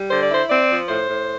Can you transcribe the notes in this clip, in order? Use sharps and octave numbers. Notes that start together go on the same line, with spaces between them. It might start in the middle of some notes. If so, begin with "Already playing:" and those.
Already playing: G3
D3 C5
D5
E4 C5
C4 D5
F3
A2 C5
A2